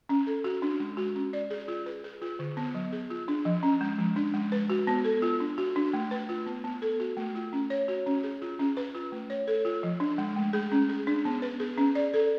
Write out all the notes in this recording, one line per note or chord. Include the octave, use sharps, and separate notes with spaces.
C#4
A4
F#4
D4
G#3
F#4
C#4
D5
G#4
F4
B4
G#4
F4
D3
B3
F#3
G#4
F4
D4
F3
C#4
G#3
F3
D4
G#3
B4
F#4
B3
A4
F4
D4
F#4
D4
A3
B4
F4
B3
B3
A4
F#4
A3
F4
C#4
C#5
F#4
C#4
G#4
F4
C#4
B4
F4
A3
C#5
A4
F4
F3
D4
G#3
A3
G#4
C#4
G#4
D4
B3
B4
G#4
C#4
D5
A4